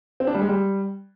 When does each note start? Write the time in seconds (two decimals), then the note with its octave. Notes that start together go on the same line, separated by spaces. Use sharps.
0.20 C4
0.27 D4
0.34 G3
0.42 G#3
0.49 G3